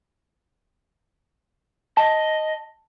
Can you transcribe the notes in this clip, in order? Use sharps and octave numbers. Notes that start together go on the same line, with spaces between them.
D#5 A5